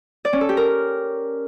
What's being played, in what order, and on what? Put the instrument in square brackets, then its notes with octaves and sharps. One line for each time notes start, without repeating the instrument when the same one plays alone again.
[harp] D5
C#4
A4
G4
A#4